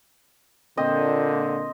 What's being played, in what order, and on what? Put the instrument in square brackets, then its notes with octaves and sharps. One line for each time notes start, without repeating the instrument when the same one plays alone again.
[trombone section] A#2 D3 [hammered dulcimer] C4 D#5